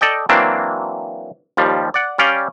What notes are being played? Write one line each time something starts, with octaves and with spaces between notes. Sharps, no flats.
A4 D5 D#5 G5
E3 F#3 A#3 C4 D4
D#2 F3 G3
D5 F#5
G3 C#4 D5 F5 G5